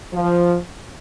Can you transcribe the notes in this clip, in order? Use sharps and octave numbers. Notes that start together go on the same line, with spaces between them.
F3